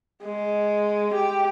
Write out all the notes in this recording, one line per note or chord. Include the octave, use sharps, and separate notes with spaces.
G#3
G4